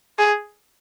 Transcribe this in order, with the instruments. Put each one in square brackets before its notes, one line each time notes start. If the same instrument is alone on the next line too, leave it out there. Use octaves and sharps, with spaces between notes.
[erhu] G#4